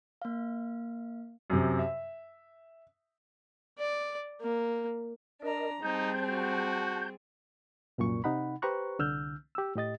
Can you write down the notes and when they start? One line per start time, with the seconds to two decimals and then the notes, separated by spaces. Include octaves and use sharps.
0.22 A#3 F5
1.50 F#2 C3
1.79 E5
3.78 D5
4.41 A#3
5.42 D4 A#4 D#5 A#5
5.82 G3 C4 D#4 G#4 A5 G6
6.26 F#4
7.98 C2 F#2 A#2 C#6
8.24 C3 D#4 F#5 B5
8.62 G4 B4 C5 A#5 C#6 F#6
8.99 C2 D3 E6 F6 G6
9.55 G4 E6
9.75 A2 G4 D#5 A6